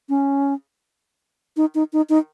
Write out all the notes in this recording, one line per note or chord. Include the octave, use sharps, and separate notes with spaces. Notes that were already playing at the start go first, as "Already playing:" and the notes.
C#4
D#4
D#4
D#4
D#4